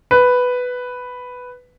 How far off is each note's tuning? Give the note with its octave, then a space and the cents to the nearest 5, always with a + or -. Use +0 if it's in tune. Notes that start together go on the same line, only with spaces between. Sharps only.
B4 +5